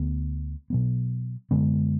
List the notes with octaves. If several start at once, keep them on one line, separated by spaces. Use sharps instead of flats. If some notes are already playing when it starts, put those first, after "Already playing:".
Already playing: D2 D3 B3
B2 F#3 B3
F#2 D3 G#3 B3